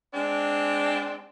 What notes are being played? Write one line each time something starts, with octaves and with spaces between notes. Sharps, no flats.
G#3 C4 D4